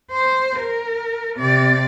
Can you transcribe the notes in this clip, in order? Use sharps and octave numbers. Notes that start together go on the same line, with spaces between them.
C5
A#4
C3 D5